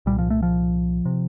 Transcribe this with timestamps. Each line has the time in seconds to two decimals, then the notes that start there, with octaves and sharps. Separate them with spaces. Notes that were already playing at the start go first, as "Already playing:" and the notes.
0.06 C2 A#2 G3
0.18 F3
0.30 A3
0.43 F3
1.06 C3